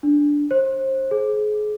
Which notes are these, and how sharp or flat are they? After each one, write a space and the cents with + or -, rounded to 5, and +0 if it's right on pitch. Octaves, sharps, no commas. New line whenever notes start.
D4 -5
C5 +30
G#4 +30